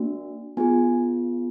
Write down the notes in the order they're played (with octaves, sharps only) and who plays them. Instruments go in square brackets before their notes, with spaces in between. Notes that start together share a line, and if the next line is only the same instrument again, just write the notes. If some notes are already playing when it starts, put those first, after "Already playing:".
Already playing: [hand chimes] A#3 D4 F#4
B3 F4 G#4 G#5